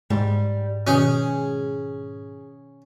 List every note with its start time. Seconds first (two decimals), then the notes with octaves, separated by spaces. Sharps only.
0.10 G#2 G3
0.87 B2 D#3 C#4 F#4 G#4